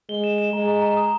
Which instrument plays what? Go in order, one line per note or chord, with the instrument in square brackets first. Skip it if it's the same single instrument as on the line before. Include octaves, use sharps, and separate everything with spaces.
[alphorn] G#3 [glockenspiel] G7
[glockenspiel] E7
E7
[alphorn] G#3 [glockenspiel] A#5
[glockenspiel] A#5
A#5
D#6